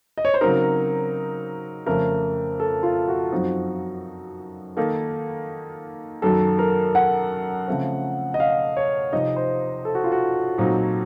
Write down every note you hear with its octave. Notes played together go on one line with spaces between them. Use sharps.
D#5
C#5
C5
C#3 F#3 C4 D#4 A#4
F2 C#3 A3 A#4
A4
F4
F#4
F#2 F3 C4 D#4
D#3 A#3 D#4 A4
F#2 D#3 F#3 A4
A#4
F#5
C#3 F3 A3 C4
D#5
F5
C#5
C3 F3 C4 D#4 D#5
C5
A4
F#4
F4
F#4
A#2 F#3 C4 D#4